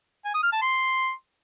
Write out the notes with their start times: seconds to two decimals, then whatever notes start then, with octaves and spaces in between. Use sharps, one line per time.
0.25 G#5
0.34 D#6
0.43 F6
0.52 A5
0.62 C6